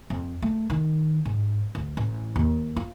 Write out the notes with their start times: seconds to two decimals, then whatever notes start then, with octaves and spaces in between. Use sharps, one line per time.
0.10 F2
0.42 A3
0.70 D#3
1.25 G#2
1.75 D2
1.97 A1
2.36 D#2
2.76 F4